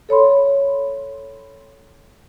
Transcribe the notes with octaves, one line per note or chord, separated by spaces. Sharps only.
A4 C#5 B5 C6